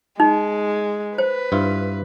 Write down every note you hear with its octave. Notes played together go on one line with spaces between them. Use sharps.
G#3 D#4
B4 C5
G2 E4 F4